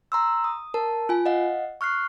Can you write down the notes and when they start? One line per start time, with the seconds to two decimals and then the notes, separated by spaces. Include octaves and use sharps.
0.12 A#5 C6 E6
0.44 D#6
0.74 A#4 A5
1.09 F4 G#5
1.26 D#5 F5 F#5
1.81 C#6 F6 F#6 C7